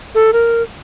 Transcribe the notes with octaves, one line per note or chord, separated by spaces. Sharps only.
A4
A#4